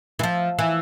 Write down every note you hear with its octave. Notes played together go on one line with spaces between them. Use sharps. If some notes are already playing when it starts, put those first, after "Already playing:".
E3
F3
E3